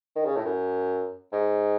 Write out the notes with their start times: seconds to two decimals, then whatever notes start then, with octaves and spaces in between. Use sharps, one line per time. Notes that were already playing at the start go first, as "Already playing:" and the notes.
0.16 D#3
0.26 C#3
0.36 A2
0.45 F#2
1.32 G#2